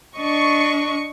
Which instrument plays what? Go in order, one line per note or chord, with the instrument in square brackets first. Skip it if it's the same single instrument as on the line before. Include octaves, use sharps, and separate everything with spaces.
[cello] D4 D#5 [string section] C#6